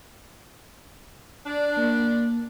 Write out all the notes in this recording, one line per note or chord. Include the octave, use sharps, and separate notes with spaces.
D4
A#3